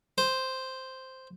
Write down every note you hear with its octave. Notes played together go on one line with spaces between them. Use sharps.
C5